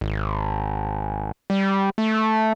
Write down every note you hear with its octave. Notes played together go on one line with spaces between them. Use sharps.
G#1
G3
A3